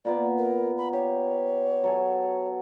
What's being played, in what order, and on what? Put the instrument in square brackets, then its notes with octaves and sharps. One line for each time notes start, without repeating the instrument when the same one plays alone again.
[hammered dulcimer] A#2 A#3 B3 [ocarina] D5
[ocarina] A#4
B5
[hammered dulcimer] G4 [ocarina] C#5
[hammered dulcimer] F#3 A4 G#5